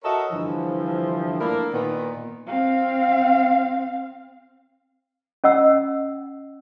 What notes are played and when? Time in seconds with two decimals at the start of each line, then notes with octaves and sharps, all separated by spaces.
0.04 F#4 A4 A#4 C#5 D#5 E5
0.32 G2 D3 E3 F3
1.41 A3 A#3 D4 E4 A#4
1.73 A#2 D#3 B3
2.46 C4 F5
5.44 C#4 D#5 F#5 E6